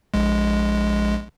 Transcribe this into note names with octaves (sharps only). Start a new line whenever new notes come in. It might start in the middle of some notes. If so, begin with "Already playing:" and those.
A#1 G#3